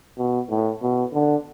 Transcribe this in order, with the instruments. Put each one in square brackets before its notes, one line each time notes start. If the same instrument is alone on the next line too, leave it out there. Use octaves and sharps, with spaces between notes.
[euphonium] B2
A2
B2
D3